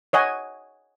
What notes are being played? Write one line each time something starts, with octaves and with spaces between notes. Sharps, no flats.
C#5 D#5 F#5 G#5